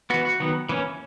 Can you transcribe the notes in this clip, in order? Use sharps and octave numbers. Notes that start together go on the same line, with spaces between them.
E3 B3 F#4
F#4
D#3 F#3 B3
E3 A#3 C#4